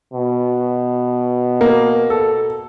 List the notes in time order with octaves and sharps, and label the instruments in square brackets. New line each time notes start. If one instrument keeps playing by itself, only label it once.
[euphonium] B2
[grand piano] A#3
A4